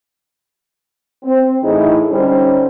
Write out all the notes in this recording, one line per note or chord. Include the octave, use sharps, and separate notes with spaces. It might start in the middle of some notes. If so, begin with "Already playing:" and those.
C4
A2 E3 D#4 E4 G#4
D3 G3 C#4 D#4 C5